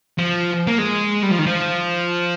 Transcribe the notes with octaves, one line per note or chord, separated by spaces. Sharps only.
F3
A#3
G#3
G3
F3
D#3
F3